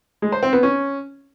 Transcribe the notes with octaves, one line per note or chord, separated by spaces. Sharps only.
G#3
C5
C4
B3
C#4